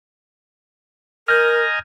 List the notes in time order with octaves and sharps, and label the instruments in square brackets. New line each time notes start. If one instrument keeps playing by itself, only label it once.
[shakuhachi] A#4 [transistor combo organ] D#5 G#5 A#5 [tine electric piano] F6 G6